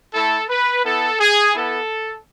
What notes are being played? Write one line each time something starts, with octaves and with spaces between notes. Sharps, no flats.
A3 E4 A4
B4
B3 E4 A4
G#4
B3 E4 A4